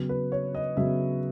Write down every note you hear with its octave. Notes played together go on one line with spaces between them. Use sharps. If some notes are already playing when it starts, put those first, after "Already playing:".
Already playing: C#3 F#3 B3
B4
C#5
D#5
C#3 F#3 B3 E5